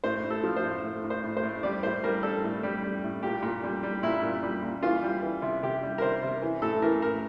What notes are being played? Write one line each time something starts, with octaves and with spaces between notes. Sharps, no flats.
A2 C5
A2
A4
F3
C5
A2
A2
A2
C5
A2
C5
A2
G3 D5
A2 C5
G3 A#4
G3 A4
A2
G3
G3
A2
A#2 G4
A#2
G3
G3
A#2 E4
A#2
G3
A#2
E3 F4
G3
E3
C3
C3 G4
G3
A#4
C3 C5
C3
E3
A2 A4
E3 A#4
A2 A#4